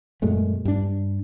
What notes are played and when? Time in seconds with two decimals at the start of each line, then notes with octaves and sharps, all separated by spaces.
0.22 F#2 A#2 G#3 A3
0.65 G2 D4